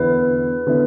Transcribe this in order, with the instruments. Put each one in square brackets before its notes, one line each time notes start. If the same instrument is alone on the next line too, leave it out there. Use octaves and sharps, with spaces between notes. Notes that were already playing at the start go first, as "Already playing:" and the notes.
Already playing: [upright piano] E2 D3 B3 E4 [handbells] B4
[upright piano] D3 B3 E4